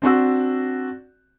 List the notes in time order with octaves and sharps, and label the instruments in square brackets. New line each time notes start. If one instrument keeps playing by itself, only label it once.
[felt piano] C4 D4 F#4 E6